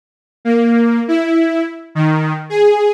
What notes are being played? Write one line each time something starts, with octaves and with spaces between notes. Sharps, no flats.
A#3
E4
D#3
G#4